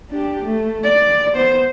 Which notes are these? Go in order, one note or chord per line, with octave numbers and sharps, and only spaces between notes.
D4 G4
A3
D5
B3 C5